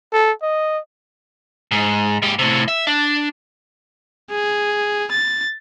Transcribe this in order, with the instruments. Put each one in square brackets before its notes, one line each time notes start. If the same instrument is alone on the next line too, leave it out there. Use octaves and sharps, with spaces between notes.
[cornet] A4
D#5
[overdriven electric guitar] G#2
G#2 G4
A2 C3
E5
D4
[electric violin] G#4
A6